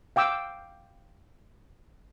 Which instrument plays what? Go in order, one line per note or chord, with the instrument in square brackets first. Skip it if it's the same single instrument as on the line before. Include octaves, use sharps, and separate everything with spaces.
[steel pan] F5 G5 D6 E6